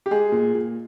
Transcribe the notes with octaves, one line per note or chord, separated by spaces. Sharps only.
G4
G#3 G#4
A#2
A#2